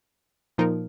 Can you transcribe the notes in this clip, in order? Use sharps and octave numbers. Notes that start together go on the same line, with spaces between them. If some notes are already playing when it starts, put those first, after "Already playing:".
A#2 F3 A#3 D#4 A#4